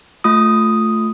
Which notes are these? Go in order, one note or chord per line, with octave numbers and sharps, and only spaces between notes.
A3 F4 D#6